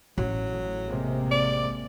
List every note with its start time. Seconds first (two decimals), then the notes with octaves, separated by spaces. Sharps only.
0.18 A1 F#3
0.49 A2
0.86 C3 G#3 A#3
1.31 D5